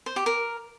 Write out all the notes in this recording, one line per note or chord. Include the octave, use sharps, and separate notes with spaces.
C5
G4
A#4